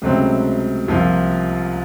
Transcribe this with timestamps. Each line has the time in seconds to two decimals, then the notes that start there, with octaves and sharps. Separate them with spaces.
0.02 C#2 C3 F#3 A3 C4
0.88 C2 C3 F3 A#3 F4